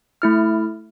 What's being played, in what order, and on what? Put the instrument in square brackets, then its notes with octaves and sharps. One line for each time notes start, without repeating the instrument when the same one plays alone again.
[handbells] A3 E4 F6